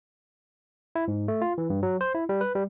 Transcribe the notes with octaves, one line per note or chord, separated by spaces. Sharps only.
E4
G#2
A3
F4
E3
G2
F#3
C5
E4
G3
B4
G3